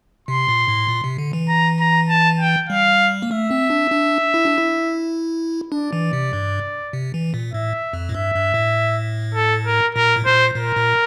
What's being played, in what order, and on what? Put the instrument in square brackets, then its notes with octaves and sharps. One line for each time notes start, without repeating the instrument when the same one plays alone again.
[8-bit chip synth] C3 [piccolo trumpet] C6
[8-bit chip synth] A#2
A2
A#2
C3
D3
E3
[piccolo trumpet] A#5
A#5
A5
G5
[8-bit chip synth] G3 [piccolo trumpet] F5
[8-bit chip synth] A#3
[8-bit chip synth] A3 [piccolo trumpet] E5
[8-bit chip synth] C4
D4
D4
E4
D4
E4
[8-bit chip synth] D4 [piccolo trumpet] D5
[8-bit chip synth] E3
C3
G2
C3
E3
A#2
[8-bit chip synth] A2 [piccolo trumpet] E5
[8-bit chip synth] F2
A2
[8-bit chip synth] G2 [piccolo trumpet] E5
[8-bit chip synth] G2
A2
[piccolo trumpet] A4
A#4
[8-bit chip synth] A#2 [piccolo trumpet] A#4
[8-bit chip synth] A2
[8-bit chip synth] A#2 [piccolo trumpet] C5
[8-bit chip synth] A#2 [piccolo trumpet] A#4
[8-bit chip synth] A#2